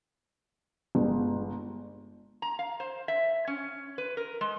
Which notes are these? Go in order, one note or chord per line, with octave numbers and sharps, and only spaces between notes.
G1 G#3
A#5
F5
C5
E5
C#4
B4
A#4
G#3